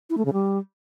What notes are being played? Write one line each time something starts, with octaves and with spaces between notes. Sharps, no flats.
E4
A3
C#3
G3